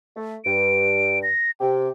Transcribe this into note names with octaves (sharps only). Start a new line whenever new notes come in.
A3
G2 D7
A#6
C3 G4 G5